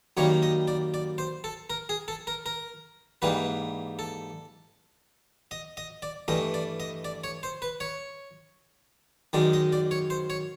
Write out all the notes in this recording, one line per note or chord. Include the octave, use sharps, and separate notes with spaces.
F#2 D#3 G3 A#3 C#5
D#5
D5
D5
C5
A4
A#4
G#4
A4
A#4
A#4
G#2 E3 G3 A#3 B4
A4
D#5
D#5
D5
G2 E3 A3 D#5
D5
D#5
D5
C#5
C5
B4
C#5
F#2 D#3 G#3 D5
D#5
D5
C#5
C5
C#5